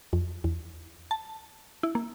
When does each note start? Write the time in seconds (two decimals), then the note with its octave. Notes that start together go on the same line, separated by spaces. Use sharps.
0.13 F2
0.44 E2
1.11 A5
1.83 E4
1.95 A#3